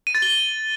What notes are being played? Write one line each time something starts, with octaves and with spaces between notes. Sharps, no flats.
D#7
A6
G7